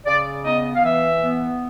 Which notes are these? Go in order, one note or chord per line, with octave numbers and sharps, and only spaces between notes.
C#3 D5
B3 D#5
F5
E3 E5
B3